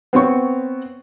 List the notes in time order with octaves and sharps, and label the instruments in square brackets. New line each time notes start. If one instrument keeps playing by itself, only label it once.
[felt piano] B3 C4 C#5 C#6